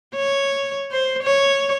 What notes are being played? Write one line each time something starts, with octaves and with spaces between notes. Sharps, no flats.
C#5
C5
C#5